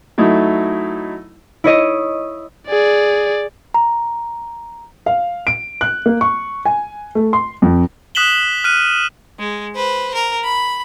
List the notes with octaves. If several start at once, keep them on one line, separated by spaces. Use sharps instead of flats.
F#3 A3 D#4 E4
E4 C#5 D#5
G#4 D5
A#5
F5
D7
F#6
A#3
C#6
G#5
A3
C6
F2
D#6 F#6 B6 E7 F#7 G7
F6 F#6 D#7
G#3
B4 C5
A#4
B5